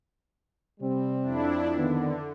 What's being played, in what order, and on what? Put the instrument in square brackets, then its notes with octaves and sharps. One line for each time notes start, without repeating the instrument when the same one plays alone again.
[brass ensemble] C3 G3 C4
[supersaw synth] F2 D4 E4
[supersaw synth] D3 [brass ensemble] D#3 B3